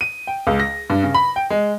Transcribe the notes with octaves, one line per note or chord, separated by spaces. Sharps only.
D#7
G5
C#2
A#6
G2
C#3
B5
G5
G#3